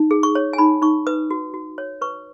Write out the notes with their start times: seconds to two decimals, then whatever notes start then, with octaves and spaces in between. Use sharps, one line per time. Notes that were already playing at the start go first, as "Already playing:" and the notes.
Already playing: D#4
0.11 G#4
0.23 C#6
0.35 C#5
0.53 G#5
0.58 D#4 B5
0.82 D#4 C#6
1.07 B4 D#6
1.31 F#4
1.54 F#4
1.78 C#5
2.01 B4 C#6